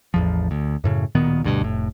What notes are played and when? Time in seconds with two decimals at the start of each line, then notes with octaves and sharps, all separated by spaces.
0.14 A1 E2 F3
0.51 D2
0.84 F#2 A2 C#3
1.15 D1 A#2 D#3 B3
1.44 D2 G2 B2
1.61 F1 A2